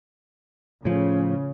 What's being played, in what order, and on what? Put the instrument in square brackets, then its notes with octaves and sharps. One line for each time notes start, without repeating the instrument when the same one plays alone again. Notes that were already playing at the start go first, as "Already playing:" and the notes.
[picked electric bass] A2 F3 [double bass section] C#3